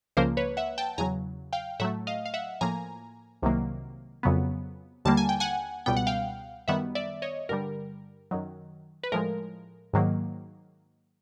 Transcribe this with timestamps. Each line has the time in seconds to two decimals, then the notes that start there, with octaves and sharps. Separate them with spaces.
0.17 C#2 C#3 F3 A#3 A#4 C5
0.37 B4 C#5
0.57 E5 F#5
0.78 G5 A5
0.98 E2 C#3 F#3 G#5 A#5
1.53 F5 G5
1.80 A2 F#3 A3 E5 F#5
2.07 D#5 F5
2.26 F5
2.34 E5 F#5
2.61 A2 F3 A#3 G#5 A#5
3.42 C2 C3 D#3 F#3 A#3
4.23 F2 C#3 F#3 B3
5.05 D#2 D3 G3 A#3 A5
5.17 G#5
5.29 G5
5.40 F#5 G#5
5.86 C#2 B2 G3 B3 G5
5.97 F#5
6.07 F5 G5
6.68 F#2 D#3 G3 B3 E5 F#5
6.95 D5 E5
7.22 C#5 D#5
7.49 G2 D3 G3 A#4
8.31 F#2 D#3 F#3
9.03 B4
9.12 A2 F3 G#3 A#4
9.93 G#2 D#3 F#3 A#3